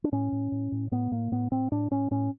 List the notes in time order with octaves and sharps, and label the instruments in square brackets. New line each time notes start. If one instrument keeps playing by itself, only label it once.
[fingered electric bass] D4
A2 C#4
A2
A2
A2
A2 B3
A2 A#3
A2 B3
A2 C4
A2 D4
A2 C#4
A2 C#4